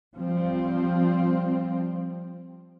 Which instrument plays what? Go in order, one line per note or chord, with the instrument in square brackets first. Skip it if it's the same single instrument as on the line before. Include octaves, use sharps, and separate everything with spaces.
[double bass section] F3 G3 C4